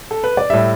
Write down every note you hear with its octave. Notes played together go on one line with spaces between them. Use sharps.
A4
B4
D5
A2 G3 E5